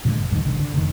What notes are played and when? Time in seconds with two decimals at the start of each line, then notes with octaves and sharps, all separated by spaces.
0.05 A#2 D3 G3 G#3
0.17 F#1
0.30 D1 G2 D#3
0.44 G1 C2 D3
0.60 D3
0.74 F1 D#3